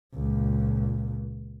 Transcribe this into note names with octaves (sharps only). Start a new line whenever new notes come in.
C#2 A#2